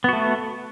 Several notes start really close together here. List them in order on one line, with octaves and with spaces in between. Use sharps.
B3 F#4 A3